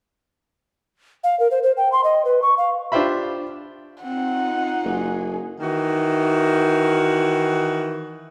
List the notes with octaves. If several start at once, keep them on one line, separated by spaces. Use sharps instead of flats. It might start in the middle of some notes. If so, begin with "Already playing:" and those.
F5
A#4
C5
C5
G5
C6
D#5
B4
C#6
F5
D4 F4 G4 C5 E5 B5
C4 D#4 F4 F#5
F#1 G#4
D#3 E3 F#4